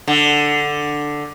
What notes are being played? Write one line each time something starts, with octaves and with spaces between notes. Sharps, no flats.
D3